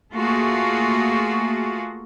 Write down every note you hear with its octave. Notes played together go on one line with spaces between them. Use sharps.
A3 A#3 F4 F#4 G#4